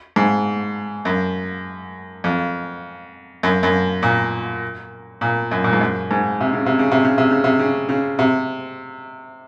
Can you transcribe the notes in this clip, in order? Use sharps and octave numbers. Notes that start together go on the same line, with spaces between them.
G#2
F#2
F2
F#2
F#2
A#2
A#2
F#2
A#2
G#2
F#2
G#2
C3
C#3
C3
C#3
C3
C#3
C3
C#3
C3
C#3
C#3
C3